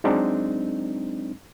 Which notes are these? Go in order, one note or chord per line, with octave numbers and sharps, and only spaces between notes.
F#3 G#3 C4 D4 D#4